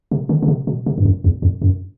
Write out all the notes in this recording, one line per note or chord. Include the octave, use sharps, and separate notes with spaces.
C3
D3
C#3
C3
B2
C3
G2
F#2
E2
F2
F#2